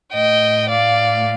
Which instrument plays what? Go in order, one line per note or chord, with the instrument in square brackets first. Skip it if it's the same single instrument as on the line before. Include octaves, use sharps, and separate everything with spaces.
[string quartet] A2 A3 D#5 G5
D5 F5